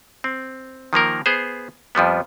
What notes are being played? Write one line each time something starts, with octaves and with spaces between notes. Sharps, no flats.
C4
D#3 F3 A#3 A#4
B3 G#4 C5
F2 F3 G3 B3